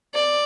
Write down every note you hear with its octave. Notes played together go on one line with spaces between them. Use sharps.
D5